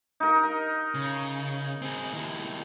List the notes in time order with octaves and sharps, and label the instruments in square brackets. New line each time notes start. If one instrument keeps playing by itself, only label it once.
[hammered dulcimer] D#4 A#4
A#4
[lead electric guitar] C#3
C4 G#4
D#2 E4